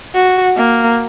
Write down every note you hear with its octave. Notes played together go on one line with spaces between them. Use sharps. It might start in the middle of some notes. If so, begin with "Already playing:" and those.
F#4
A#3